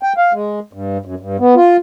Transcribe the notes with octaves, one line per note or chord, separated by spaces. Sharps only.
G5
F5
G#3
G2
F#2
G2
B3
F4